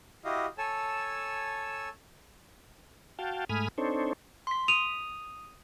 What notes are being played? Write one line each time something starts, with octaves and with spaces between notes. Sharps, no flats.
E4 F#4 G4 D#5 F5
A4 C#5 G#5 A5 E6
F#4 F5 G5 A5
G#2 A3 G#5 B5 D#6 F6
C4 D4 D#4 A4 C5 C#5
C6 B6
D#6 D#7 F7